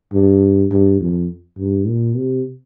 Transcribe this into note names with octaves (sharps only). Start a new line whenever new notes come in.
G2
G2
F2
G2
A#2
C3